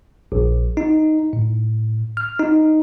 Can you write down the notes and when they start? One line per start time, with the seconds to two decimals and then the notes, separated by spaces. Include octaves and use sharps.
0.32 A#1
0.77 D#4
1.33 A2
2.17 F6
2.39 D#4